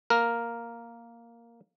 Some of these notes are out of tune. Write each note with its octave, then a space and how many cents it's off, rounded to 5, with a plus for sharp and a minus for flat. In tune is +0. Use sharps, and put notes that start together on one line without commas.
A#3 +0 A#4 +0